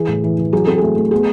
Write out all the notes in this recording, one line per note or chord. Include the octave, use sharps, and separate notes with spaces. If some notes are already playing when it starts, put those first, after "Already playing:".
Already playing: E3 G#4
A2
E3
E3
F#3 G#4
C4 A4
A3 G#4
A3
B3 G#4